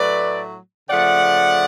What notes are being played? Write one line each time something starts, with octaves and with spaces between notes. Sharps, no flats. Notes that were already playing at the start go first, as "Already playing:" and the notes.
Already playing: A2 F#3 A3 B4 D5
C#3 F3 A3 D5 F#5